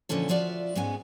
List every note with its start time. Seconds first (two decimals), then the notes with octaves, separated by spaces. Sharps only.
0.09 A#2 D3 E3 F3 C#4 A4
0.29 F3 F4 F#4 D5 E5
0.75 G#2 G#3 B3 C#4 G#5